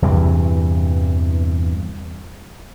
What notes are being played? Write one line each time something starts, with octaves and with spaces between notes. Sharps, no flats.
E2 G2 C3 E3